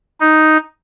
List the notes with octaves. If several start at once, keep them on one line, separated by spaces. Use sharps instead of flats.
D#4